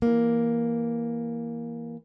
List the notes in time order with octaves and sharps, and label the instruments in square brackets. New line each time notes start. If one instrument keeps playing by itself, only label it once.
[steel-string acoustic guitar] E3 A#3